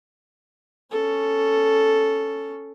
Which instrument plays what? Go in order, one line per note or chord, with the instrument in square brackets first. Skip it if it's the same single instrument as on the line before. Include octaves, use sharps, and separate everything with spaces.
[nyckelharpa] C#4 A4